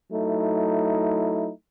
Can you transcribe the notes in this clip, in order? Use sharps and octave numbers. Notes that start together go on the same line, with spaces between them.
F#3 A3 D#4 E4